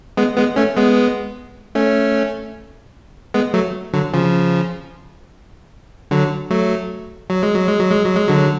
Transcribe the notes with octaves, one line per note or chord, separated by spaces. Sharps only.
G#3 B3
G#3 B3
A3 C#4
G#3 B3
A3 C#4
G#3 B3
F#3 A3
D3 F#3
C#3 F3
D3 F#3
F#3 A3
F#3
G#3
F#3
G#3
F#3
G#3
F#3
G#3
D3 F#3